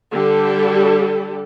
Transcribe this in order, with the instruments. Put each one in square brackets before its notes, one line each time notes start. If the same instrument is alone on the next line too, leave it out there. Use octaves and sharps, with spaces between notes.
[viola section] D3 G3 G4 A4